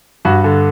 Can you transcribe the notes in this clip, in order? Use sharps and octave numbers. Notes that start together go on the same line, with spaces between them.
G2 F#4
D3